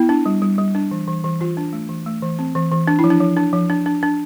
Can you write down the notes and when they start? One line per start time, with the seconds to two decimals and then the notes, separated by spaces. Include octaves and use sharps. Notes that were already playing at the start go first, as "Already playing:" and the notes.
Already playing: B3 E4
0.09 D4
0.26 G3
0.42 G3
0.58 G3
0.75 D4
0.91 E3
1.08 E3
1.24 E3
1.41 E3 F4
1.57 D4
1.73 A3
1.89 E3
2.06 A3
2.22 E3
2.39 C4
2.55 E3
2.72 E3
2.88 D4
2.99 E4
3.04 F3
3.10 D4
3.20 F3
3.37 D4
3.53 F3
3.70 D4
3.86 D4
4.03 D4